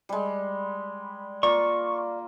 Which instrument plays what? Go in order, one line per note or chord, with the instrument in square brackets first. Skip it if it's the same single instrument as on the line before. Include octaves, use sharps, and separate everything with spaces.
[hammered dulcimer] G3 G#3
[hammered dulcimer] A#3 F4 [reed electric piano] D5 [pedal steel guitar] C#6